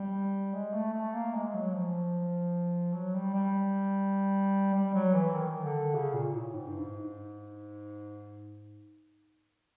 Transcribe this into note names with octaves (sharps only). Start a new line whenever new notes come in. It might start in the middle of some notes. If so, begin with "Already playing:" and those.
Already playing: G3
G#3
A3
A3
A#3
G#3
F#3
F3
F#3
G3
G3
G3
F#3
E3
D#3
D3
C#3
A#2
A2
G#2
G2
G#2